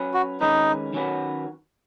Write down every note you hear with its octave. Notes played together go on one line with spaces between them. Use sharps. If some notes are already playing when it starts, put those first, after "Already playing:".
Already playing: F#3 C#4 B4
F#4
D#3 G#3 C#4 D#4 B4
D#3 F#3 C#4 F#4 B4